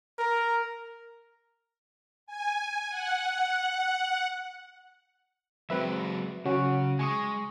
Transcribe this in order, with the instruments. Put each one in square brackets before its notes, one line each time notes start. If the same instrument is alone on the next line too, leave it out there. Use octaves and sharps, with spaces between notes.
[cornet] A#4
[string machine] G#5
F#5
[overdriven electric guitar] F#3 G#3 [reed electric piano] C4 B4 E5
[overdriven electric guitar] C#3 [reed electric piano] F#3 C#4 F#4
[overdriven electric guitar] G#3 [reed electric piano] G#5 C#6 D#6